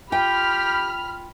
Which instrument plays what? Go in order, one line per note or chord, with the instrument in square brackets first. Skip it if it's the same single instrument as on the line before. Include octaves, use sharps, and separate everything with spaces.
[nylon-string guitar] F4 G5 [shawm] G4 [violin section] B5 F6